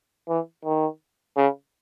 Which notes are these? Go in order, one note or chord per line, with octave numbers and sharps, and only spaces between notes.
E3
D#3
C#3